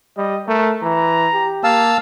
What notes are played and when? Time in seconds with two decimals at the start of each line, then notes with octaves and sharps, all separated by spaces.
0.17 G3 D#5
0.48 A3 A#4
0.82 E3 A#5
1.33 G4
1.64 A#3 F5 A5 E6